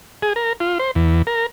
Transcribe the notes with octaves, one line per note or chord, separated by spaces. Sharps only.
G#4
A#4
F4
C5
E2
A#4